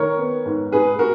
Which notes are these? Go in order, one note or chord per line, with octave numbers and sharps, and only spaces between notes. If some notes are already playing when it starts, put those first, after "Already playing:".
Already playing: D#3 A#4 C#5
B3
G#2
G#2 G#4 B4
F#4 A#4